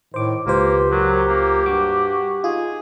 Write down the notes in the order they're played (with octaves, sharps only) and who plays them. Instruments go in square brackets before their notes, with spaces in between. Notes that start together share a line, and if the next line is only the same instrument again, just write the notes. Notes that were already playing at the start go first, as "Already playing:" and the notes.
[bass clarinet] A2 [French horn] D#3 [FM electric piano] C5 D6
[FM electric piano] C#2 F4 C5 [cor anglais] A#3 [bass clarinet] G4 [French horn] B4
[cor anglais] F#3 [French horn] A#4
[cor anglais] A#3
[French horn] G2 [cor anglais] F#4 [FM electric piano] D6
[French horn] D#4 [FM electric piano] F4 [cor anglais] G#4